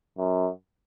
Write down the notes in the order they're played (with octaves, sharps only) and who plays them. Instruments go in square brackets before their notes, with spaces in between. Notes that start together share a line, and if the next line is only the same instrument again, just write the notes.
[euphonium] F#2